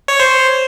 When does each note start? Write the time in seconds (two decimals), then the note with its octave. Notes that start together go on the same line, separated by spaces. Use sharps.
0.08 C#5
0.20 C5